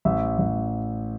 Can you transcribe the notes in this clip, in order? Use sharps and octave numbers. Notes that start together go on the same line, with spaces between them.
A1 E5
A1